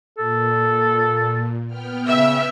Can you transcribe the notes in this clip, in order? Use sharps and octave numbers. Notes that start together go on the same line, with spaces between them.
A#2 A4
B3 G5 F6
C#3 E5